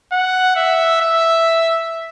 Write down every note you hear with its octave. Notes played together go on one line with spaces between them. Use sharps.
F#5
E5
E5